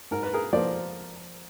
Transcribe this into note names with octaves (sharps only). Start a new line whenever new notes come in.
G#2 A#4
B4
G#4 A#4
F3 A#3 C5 D5